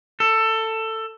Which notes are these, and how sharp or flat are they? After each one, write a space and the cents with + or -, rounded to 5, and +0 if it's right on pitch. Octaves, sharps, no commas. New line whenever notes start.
A4 +15